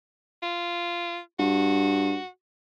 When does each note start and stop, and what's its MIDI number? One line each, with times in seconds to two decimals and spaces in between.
0.43 1.20 65
1.39 2.17 43
1.39 2.28 66